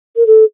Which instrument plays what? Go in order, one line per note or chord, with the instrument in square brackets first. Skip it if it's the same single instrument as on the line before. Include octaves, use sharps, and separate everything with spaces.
[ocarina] A#4
A4